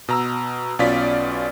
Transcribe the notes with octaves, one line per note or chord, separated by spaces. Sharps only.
B2 A#5 E6
B1 B2 C#4 F4 D5 B6